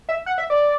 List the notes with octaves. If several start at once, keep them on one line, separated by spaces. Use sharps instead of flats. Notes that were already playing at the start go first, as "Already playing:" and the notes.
E5
F#5
E5
D5